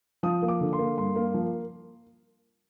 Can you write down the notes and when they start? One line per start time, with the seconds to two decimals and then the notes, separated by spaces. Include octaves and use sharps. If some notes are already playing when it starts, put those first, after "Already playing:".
0.23 F3 D#6
0.42 A#3
0.48 D6
0.61 D3
0.73 C6
0.79 A#3
0.98 G2 C6
1.16 A#3
1.34 F3